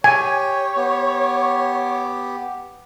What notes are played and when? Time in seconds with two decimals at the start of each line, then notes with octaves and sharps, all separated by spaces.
0.04 G4 C#5 G5 G#5
0.76 B3 G4